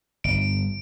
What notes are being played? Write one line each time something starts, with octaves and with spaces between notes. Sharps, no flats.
G1 D7